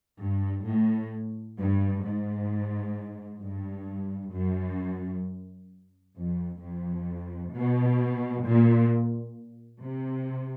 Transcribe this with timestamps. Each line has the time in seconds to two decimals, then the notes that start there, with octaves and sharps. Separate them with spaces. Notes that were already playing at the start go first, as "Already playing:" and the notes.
0.21 G2
0.67 A2
1.59 G2
2.04 G#2
3.42 G2
4.33 F#2
6.16 F2
6.61 F2
7.53 B2
8.44 A#2
9.81 C3